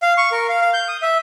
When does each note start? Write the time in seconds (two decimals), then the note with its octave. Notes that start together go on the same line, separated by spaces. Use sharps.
0.02 F5
0.17 C#6
0.32 A#4
0.49 F5
0.62 F5
0.73 G6
0.88 D#6
1.02 E5